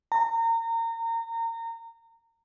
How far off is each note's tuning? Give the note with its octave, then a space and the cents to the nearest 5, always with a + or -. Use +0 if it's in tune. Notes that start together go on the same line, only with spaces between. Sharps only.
A#5 -30